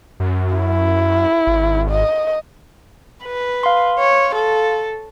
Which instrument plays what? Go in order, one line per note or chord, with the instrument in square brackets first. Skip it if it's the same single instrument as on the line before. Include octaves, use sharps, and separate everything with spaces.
[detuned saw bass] F#2
[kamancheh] E4
[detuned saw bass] G#1
[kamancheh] D#5
[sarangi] B4
[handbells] F5 C6
[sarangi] C#5
A4